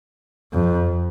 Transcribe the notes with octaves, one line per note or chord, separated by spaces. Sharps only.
F2